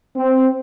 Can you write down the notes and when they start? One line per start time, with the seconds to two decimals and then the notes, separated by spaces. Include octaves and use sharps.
0.16 C4